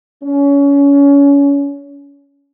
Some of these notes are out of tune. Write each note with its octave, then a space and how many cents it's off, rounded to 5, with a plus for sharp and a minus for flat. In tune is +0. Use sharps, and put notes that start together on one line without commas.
C#4 +25